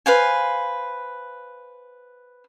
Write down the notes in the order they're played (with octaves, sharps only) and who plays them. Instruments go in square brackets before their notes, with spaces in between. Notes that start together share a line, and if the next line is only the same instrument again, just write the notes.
[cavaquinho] B4 C5 F5 G#5